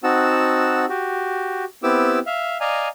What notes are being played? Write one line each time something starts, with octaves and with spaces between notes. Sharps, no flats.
C4 D#4 F#4 F#5 A5 E6
F#4 G4
B3 C4 E4 G4 D6 E6
E5 F5
D5 D#5 F5 G#5 A#5